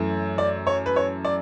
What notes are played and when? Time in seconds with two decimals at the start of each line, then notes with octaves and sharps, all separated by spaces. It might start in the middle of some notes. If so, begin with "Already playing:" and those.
Already playing: F#2 E3 A3
0.38 D5
0.67 C#5
0.86 B4
0.96 C#5
1.25 D5